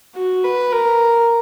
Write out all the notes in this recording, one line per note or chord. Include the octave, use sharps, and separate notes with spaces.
F#4
B4
A#4